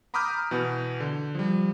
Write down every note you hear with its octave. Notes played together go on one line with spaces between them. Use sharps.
A#5 B5 D6 D#6 F6 G6
B2 E3 B3
D3
F3 G3